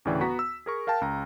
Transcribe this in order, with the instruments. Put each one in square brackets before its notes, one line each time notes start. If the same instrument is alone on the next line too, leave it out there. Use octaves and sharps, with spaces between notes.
[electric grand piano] D2 A2 C#3 E3 D5 G5
B3 F#4 A#5 B6
E6
G#4 A#4 C#6
A#4 F5 G5 A5
C#2 A#5